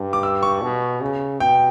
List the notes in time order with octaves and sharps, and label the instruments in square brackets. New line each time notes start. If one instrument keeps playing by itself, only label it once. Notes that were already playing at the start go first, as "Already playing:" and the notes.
Already playing: [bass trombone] G2
[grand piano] D6
E6
C#6
[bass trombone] B2
C#3
[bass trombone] B2 [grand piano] G5